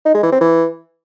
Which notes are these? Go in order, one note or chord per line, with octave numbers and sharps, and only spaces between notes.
D#4
G#3
E3
C4
E3